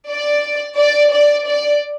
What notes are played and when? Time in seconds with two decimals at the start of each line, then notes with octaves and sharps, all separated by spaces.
0.10 D5
0.79 D5
1.13 D5
1.48 D5